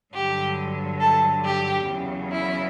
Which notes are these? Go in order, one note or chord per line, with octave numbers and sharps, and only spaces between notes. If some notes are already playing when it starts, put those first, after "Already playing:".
G2 D3 F#3 G4
A4
G4
E2 C#3 F#3
E4